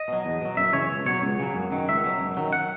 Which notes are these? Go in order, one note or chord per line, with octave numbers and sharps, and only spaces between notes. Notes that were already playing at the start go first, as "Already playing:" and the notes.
Already playing: D#5
B2 F#3
E2
B2 F#3
F#2 E5
C#3 E3 C#5
C#2
B2 F#3 C#5
C#2
C#3 F#3
F#2
D#3 F#3
C#2 E5
B2 F#3
F#2
D#3 F#3
F#5